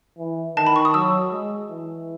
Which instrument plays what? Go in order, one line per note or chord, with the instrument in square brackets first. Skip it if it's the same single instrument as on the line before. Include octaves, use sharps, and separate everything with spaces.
[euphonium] E3
[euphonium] D#3 [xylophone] A5
[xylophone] B5
C#6
D#6
[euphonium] F#3 [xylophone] E6
[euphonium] G#3
E3